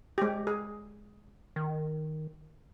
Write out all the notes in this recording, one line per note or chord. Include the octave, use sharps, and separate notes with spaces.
G#3 G4
G#4
D#3